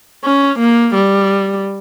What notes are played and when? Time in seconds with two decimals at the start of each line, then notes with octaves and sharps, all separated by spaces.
0.24 C#4
0.59 A#3
0.95 G3